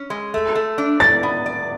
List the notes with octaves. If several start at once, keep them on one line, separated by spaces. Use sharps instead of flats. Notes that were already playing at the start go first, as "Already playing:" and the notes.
Already playing: C#4
G#3
A3
A3
D4
D5 A6
B3
D5